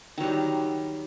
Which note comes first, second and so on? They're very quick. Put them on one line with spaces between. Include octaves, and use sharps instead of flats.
D#3 F#3 G3